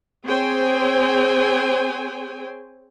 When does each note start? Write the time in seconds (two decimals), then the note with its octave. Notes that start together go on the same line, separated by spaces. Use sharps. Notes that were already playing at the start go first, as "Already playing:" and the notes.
0.25 C4 G#4 C5 C#5 G5 G#5